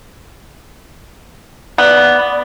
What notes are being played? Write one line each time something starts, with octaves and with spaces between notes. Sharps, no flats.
B3 D5